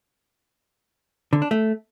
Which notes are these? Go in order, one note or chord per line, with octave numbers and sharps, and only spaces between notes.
D3
D4
A3